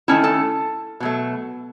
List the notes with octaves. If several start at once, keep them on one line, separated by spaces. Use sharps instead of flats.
D#3 A3 C#4 E4 A5
A4 A5
B2 F#3 A3